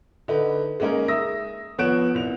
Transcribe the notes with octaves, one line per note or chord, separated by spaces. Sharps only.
D3 D#4 B4
G#3 A#3 C#4 D#4 A#4
E5 D#6 E6 A#6
F3 B3 C#5 F#6 D7 E7
C2 F7